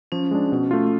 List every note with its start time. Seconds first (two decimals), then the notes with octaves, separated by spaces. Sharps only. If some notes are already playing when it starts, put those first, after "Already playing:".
0.12 F3 C#4
0.31 G#3 D4
0.52 B2
0.71 A3 F4